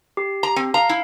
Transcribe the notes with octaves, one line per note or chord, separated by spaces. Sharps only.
G4
A#5
C4
F5 A#5
E4